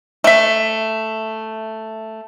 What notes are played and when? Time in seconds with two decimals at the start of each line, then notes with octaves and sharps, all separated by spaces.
0.24 A3 E5